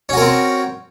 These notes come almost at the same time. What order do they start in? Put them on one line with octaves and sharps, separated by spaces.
C#4 F#4 A#4 C4